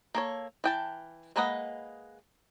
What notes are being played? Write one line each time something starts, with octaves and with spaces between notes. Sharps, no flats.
A#3 A4 C#5
E3 G5 A5
G#3 A#3 B4 D#5 F#5